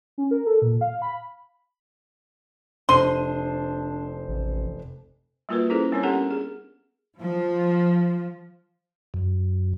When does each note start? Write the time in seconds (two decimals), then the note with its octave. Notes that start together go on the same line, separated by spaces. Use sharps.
0.18 C#4
0.31 A#4
0.47 A4
0.62 A#2
0.81 F5
1.02 B5
2.89 F1 D4 C5 C6 D#7
4.29 A1
5.49 G3 A#3 F4 F#4 A#4 B4
5.70 C#4 E4 G#4 A4 C5
5.92 G3 B3 C4 D4 A#4 C#5
6.03 C#4 D4 G4 A4 A#4 F#5
6.31 G#4
7.21 F3
9.14 F#2